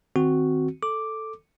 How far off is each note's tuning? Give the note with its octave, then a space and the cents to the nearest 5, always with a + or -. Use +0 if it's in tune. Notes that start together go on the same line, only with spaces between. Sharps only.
D#3 +0 C4 +0 F#4 +0
A4 +0 D6 +0